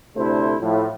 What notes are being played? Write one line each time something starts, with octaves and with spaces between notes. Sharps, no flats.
D2 C3 A3 D4 E4 C5
A2 F3